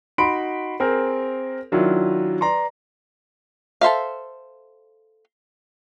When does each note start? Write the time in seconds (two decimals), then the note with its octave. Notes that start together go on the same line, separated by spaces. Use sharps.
0.18 D#4 F#4 B5 C6 D7
0.80 C4 G#4 A#4 C5
1.72 D#3 F#3 D4 E4 F4
2.41 B4 D5 A#5 C6
3.81 A4 C5 E5 F5